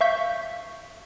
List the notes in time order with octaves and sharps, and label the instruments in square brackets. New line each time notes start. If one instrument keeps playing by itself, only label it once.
[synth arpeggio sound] E5 F5 C#6 G6 B6